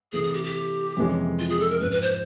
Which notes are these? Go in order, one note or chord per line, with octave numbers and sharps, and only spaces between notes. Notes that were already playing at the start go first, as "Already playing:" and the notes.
C3 E3 A3 G#4
G#4
G4
G4
F2 C3 E3 G#3 C#4
F4
G#4
A4
A#4
G#2 F3 G#3 C#4 B4
B4
C5